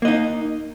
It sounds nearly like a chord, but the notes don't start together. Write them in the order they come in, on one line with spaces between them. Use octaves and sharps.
A#3 D#5 D#4